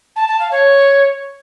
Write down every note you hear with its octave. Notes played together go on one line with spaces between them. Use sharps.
A5
A5
F5
C#5